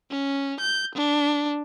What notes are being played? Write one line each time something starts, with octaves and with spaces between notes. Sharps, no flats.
C#4
G6
D4